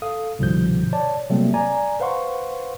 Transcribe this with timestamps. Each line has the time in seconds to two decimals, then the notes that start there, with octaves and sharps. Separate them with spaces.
0.02 A4 F5 D#6
0.39 C2 G2 B2 D3 F3 G6
0.93 C#5 D5 A5
1.30 C3 F#3 G3 A3 A#3 C4
1.54 D5 G#5 A#5
2.00 B4 C5 F5 F#5 C6 C#6